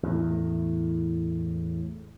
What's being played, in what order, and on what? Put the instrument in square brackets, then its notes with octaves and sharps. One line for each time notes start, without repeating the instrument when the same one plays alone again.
[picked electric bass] E2 A2